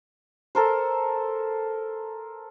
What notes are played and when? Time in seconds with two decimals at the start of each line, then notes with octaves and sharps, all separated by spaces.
0.55 A4 A#4 C5